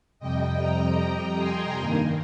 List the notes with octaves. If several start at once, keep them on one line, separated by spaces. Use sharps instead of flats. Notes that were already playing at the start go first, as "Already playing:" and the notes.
F2 C3 G3 D#5 G5
G5 A#5
G#5 C6
G2 D#3 A#3